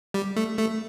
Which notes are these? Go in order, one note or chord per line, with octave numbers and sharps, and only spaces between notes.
G3
A3
A3